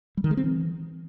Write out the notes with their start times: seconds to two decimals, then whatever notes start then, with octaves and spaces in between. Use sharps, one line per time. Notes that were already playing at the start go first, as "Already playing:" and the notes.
0.17 G3
0.24 D#3
0.31 G#3
0.37 C4
0.44 E3